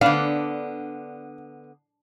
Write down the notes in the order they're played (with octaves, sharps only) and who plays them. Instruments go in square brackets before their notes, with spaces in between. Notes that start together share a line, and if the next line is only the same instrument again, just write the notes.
[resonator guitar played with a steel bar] D3 B3 [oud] D4 [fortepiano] F5